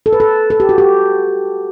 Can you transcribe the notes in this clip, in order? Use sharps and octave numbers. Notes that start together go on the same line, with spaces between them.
A4
B4
A4
A4
G4
F#4
G4